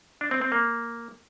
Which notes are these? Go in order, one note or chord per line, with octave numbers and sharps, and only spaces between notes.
D4
C4
C4
A#3